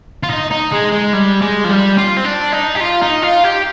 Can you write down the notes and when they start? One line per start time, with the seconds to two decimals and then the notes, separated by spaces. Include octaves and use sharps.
0.23 F4
0.30 D#4
0.51 D#4
0.72 G#3
0.92 G#3
1.13 G3
1.42 G#3
1.64 F3
1.70 G3
1.98 F4
2.17 C4
2.25 D4
2.53 D#4
2.75 G4
2.80 F4
3.02 D#4
3.22 F4
3.44 G4